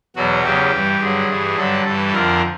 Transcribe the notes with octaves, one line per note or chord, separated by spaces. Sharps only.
E2 B2 F#3 F#4
E2 C#3 F#3 G4
G2 E3
G2 D3 F#3 G#4
G2 E3
G2 D3 F#3 A4
G2 E3 A4
F2 D3 F3 A#4